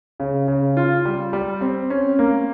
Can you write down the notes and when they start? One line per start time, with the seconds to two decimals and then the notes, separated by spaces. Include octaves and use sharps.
0.20 C#3
0.48 C#3
0.77 F4
1.05 G3
1.33 G3
1.61 C4
1.90 C#4
2.19 A#3